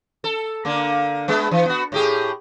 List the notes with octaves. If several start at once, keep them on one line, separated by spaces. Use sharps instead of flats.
A4
D3 A#3
G#3 B3
E3
B3 F#4
A2 G4 G#4